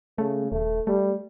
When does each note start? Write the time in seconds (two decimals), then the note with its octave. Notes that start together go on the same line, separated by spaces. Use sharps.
0.18 C#3 A3
0.52 D#1 A3
0.87 G3 A3